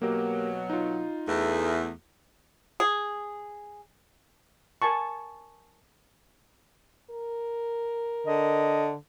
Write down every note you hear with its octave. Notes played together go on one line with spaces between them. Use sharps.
B2 F#3 A#3 G4 A#4
D#4 F4
E2 A3
G#4
A#4 G#5 A5 C#6
A#4
D3 D#5